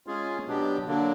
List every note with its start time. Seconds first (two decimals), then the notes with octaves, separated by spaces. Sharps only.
0.07 G#3 C#4 F4 G#4
0.46 B2 F#3 B3 D4 G4
0.86 D3 F#3 A#3 D4